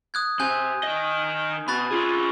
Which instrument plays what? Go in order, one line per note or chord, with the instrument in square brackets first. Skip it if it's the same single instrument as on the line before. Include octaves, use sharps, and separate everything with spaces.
[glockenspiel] D#6 F#6 G#6
[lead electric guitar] C3 [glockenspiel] G#5 F#6 G6
[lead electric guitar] D#3 D#5
[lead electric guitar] B2 [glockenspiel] B5 F#6 A6
[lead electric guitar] F4 G#4